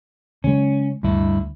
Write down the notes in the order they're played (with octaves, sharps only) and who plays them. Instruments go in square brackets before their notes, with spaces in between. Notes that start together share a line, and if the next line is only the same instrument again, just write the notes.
[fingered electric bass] C#3 F#3 G#3 [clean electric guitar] C#4
[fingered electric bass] D2 [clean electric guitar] G2 E4